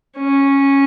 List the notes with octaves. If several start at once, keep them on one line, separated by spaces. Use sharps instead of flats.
C#4